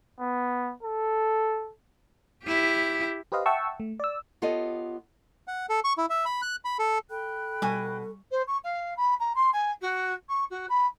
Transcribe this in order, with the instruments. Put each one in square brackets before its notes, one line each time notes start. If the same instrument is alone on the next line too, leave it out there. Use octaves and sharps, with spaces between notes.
[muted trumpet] B3
A4
[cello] E4 G4
[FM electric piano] G4 B4 C5 D#5 F5
E5 F#5 G5 A5 C#6 E6
A3
D5 E6
[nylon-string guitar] B3 F4 G4 A4 C#5 D#5
[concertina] F#5
A4
C#6
E4
E5
B5
F#6
B5
A4
[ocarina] A4 [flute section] G5 B5 F#6
[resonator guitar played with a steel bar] B2 G#5 [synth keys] G3 C#6
[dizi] C5
C#6
F5
B5
A#5
C6
G#5
F#4
C#6
F#4
B5